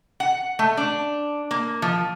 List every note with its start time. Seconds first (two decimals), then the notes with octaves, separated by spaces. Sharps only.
0.20 F#5
0.59 A3
0.77 D4
1.51 A#3
1.82 F3